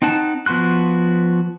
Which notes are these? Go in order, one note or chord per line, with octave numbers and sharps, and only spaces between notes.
C4 D#4 F#5 A5
F3 B3 F#4 C6 F#6